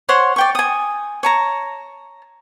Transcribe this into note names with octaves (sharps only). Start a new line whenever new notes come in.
C5 C#5 F#5 C6
D5 G5 C#6
G#5 D#6
C#5 A5 A#5